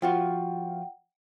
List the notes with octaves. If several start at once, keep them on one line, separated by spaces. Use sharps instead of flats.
F3 F4 F#4 F#5 G5